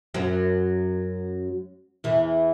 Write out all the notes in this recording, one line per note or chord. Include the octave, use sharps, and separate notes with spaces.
F#2 F#3
E2 E3